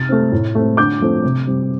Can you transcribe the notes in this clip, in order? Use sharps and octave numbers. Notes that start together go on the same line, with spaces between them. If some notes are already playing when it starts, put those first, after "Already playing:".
Already playing: C3 F6 A6
A3 C4
A2
A3 C4
D3 D6 G6
F3 A3 C4
C3
G3 C4